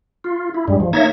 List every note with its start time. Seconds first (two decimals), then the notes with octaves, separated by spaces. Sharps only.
0.24 F4
0.54 E4
0.68 G2 G3 G#3
0.80 F3
0.93 A#3 D#4 C#5 E5 G#6 A#6